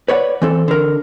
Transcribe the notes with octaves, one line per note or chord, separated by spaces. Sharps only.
B4 C#5 D5 F#5
E3 C4 A4
D3 A#4